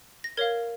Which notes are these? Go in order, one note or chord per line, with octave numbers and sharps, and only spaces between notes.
A#6
A#4 C#5 F5 G#6